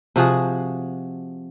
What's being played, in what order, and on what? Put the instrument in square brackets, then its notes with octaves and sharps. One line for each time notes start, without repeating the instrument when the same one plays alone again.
[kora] C3 F3 F#4 G#4